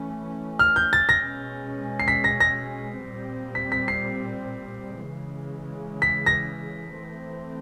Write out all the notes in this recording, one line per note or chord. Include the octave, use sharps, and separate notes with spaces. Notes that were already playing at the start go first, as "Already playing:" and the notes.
Already playing: E3 A3 C#4
F6
G6
A6
B2 G#3 C#4 A#6
C7
B6
A#6
A#6
A#2 G3 C4
B6
B6
C7
C#3 E3 G#3
B6
A#6
E3 A3 C4